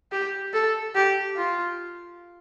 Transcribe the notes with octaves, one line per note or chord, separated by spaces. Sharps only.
G4
A4
G4
F4